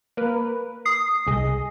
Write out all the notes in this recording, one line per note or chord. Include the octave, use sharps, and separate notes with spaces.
A#3 A#4 B4
D#6 C7
C2 G#4 D#5